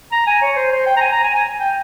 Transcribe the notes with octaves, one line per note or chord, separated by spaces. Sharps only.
A#5
G#5
C#5
C5
C5
G5
A#5
G#5
A#5
G#5
G#5
G5